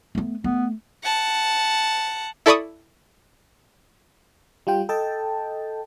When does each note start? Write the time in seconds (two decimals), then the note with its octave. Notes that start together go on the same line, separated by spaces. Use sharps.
0.15 A3 B3
0.44 A3 B3
1.03 F#5 A5
2.46 E4 A4 D5 B5 C#6 D#6
4.67 G3 F4 G5
4.89 A4 D#5 G5 A5